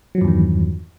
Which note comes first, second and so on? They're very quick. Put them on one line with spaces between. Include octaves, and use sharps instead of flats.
F#3 F3 G2 E2 D#3